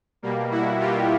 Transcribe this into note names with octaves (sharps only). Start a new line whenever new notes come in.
B2 G3 A#3
E4 F#4
F4 G4